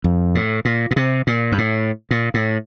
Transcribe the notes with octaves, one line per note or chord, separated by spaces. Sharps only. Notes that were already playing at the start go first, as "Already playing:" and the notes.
F2
A2
A#2
A#2
C3
A#2
G2
A2
A#2
A2